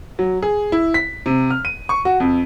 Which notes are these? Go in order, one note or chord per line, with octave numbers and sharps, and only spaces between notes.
F#3
G#4
E4
B6
C3
F6
D#7
C#6
F#4
F2